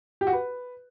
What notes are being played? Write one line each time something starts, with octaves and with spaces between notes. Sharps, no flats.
G4
F#4
B4